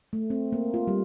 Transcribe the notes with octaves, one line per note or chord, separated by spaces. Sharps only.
A3
C4
A#3
F4
G3